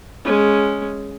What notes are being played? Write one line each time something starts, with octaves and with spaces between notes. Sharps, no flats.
G#3 C#4